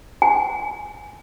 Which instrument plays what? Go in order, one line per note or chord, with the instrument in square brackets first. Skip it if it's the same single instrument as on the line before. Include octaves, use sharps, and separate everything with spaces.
[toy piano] G#5